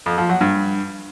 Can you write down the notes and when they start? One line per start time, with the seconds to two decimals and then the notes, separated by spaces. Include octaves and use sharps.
0.06 F2
0.18 F3
0.29 F#3
0.41 G2